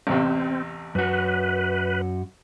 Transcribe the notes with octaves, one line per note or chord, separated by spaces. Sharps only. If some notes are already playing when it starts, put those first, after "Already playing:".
A1 E2 C3 C4
F#2 F#4 B4